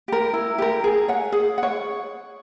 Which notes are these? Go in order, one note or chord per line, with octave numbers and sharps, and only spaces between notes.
G4 A#4
E4
G4 A#4
G#4
C#5 F#5
G#4
F#5
C#5